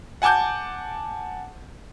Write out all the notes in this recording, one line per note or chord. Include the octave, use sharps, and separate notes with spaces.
F#5 G#5 A5 D6 G6